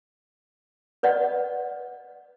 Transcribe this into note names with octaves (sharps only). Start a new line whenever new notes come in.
B4 D5 D#5 F#5